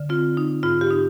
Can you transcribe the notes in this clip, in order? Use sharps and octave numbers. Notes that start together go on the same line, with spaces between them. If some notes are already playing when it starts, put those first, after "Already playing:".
Already playing: D3
C4 F4
D#4
G#2 F4
G4
D#4